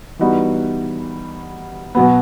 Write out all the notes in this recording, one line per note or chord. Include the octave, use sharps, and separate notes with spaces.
E3 G3 B3 D#4 F#4
B2 F#3 B3